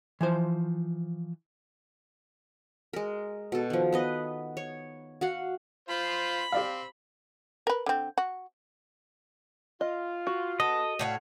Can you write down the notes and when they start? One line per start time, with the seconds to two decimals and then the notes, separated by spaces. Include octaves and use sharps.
0.21 E3 F3 C5
2.93 G#3 A#4
3.52 B2 A4
3.70 D#3 F3
3.92 B3 B4 D#5
4.57 C#5
5.21 F#4 F5 F#5
5.89 F4 C5 B5
6.52 C4 G4 D5 F5
7.67 A#4 B4
7.86 D3 C4
8.18 F#4
9.81 F4 D#5
10.27 F#4
10.60 B3 A4 D#5
10.99 A2 C#5 F5 F#5